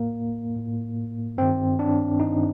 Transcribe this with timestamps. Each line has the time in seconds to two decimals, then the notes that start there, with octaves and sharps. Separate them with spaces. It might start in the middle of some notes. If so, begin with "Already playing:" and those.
Already playing: A2 A#3
0.56 A2
1.37 G2 D#3 C4
1.79 D4
2.20 G2 D#3 D#4